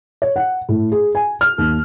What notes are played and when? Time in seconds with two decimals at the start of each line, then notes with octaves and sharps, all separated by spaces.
0.22 C#5
0.36 F#5
0.69 A2
0.92 G#4
1.15 G#5
1.41 F6
1.58 D#2